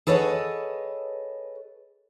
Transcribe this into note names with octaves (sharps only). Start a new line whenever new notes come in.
G#4 A4 B4 C#5 D#5 F#5